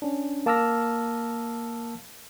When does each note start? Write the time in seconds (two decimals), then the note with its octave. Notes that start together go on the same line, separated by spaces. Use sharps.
0.02 C#4 D4
0.46 A#3 A5 D6 E6 F6 A#6